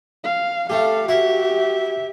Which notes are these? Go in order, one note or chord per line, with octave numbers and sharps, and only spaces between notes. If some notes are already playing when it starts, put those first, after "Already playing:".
F5
A3 G4 A4 F5
F#4 G4 E5